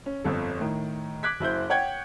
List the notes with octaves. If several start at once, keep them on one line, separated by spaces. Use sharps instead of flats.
C#4
G1 F2 A4
A2 D#3
D6 F#6 G#6 B6
F#1 E4 C5 G6
C#5 F#5 G5 G#6